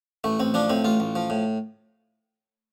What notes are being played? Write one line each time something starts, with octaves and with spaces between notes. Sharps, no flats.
A1 A3
A1 C4
F3 D4
A2 C4
A1 F4
A1
F3
A2